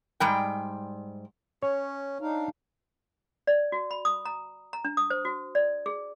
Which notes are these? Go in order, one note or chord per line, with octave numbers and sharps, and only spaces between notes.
G#2 G3 G5
C#4 C#5
D4 D#4 F5
D5
F#4
B5
D#6
A#5
A#5
D4
D#6
C5
F#4
D5
G#4